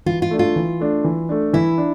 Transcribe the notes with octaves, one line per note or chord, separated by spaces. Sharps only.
E3 F4
F4
A3 D4
F4
E3
A3 D4
E3
A3 D4
E3 E4
D4